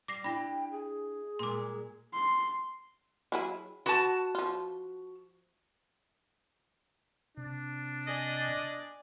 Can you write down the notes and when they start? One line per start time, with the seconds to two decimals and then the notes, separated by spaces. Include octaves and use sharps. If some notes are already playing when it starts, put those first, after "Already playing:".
0.08 G3 D6 A#6 C7
0.24 D4 E4 G4 G5 B5 A#6
0.72 G#4
1.39 A#2 G3 G#3 C6 D6
2.14 C6
3.32 F#3 E4 G#4
3.86 F#4 B4 A5
4.35 F3 F4
7.37 C3 D4
8.07 D5 D#5 G#5